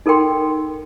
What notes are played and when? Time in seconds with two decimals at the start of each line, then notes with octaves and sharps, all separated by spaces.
0.06 D#4 A4 A#4 F#5 G5 C6